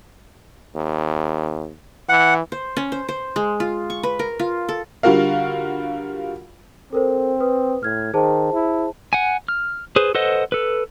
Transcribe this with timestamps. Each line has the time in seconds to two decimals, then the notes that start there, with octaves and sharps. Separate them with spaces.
0.75 D#2
2.09 E3 F#5
2.52 C5
2.77 C#4
2.92 C5
3.09 C5
3.36 G#3
3.60 F4
3.90 C#6
4.03 B4
4.19 A#4
4.39 F4
4.69 A4
5.03 D3 G3 F4 F#4 A#4 F5
6.93 C4 A4 A#4 C5
7.40 B4 D#6
7.83 A2 F6 G#6
8.14 D#3 G#4 C5 A5
8.53 E4
9.13 F#5 G#5
9.48 F6
9.96 G#4 B4 C5
10.15 A4 B4 C5 D#5 F#5
10.52 A4 B4